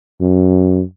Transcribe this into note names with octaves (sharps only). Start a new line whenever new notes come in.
F#2